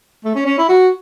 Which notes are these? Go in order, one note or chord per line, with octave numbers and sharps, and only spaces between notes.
A3
C#4
C#4
E4
F#4